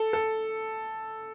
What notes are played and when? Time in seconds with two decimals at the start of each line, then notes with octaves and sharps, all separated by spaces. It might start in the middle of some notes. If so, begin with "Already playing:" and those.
Already playing: A4
0.13 A4